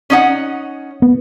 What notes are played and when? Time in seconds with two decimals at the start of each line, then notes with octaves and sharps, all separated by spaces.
0.10 C#4 D#4 F#5
1.02 B3